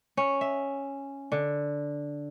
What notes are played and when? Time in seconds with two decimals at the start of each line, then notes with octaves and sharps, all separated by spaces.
0.17 C#4
0.41 E5
1.32 D3